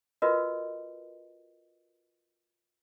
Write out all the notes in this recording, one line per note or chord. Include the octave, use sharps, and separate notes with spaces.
F4 F#4 A#4 B4 D#5